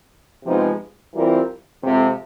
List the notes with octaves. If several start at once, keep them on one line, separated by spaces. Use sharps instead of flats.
C3 F3 G#3 B3 D#4
E3 G3 C4 F4 A#4
F2 C3 F3 G#3 C4